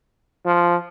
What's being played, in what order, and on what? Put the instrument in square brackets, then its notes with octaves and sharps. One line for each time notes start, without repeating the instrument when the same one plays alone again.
[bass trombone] F3